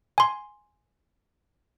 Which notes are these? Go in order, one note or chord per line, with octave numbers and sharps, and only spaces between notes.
G#5 C6